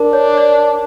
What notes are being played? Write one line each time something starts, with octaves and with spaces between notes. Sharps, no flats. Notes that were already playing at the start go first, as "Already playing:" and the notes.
Already playing: D4 A#4
C#5
D5